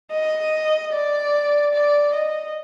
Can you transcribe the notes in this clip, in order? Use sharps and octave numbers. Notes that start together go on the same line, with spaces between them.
D#5
D5
D5
D#5